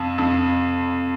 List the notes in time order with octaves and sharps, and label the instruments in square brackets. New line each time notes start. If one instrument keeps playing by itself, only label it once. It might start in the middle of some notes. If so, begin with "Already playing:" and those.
Already playing: [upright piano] F2
F2